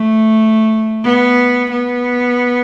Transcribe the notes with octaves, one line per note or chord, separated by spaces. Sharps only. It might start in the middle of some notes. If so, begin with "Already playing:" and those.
Already playing: A3
B3
B3